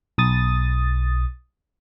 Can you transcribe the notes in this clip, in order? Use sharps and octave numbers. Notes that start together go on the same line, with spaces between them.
B1 D#6 A6